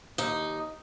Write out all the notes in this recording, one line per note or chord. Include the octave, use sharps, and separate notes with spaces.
D#2 D#4